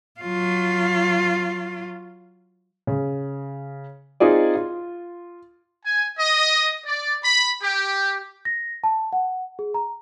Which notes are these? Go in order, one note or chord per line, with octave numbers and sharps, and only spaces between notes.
F#3 F4
C#3
C4 D#4 F4 G#4 D5
F4
G#5
D#5
D5
B5
G4
A#6
A5
F#5
G#4
A#5